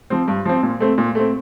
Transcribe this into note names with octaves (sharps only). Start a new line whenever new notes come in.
F3 C4
G2
F3 C4
A#2
A3 C4
A#2
A3 C4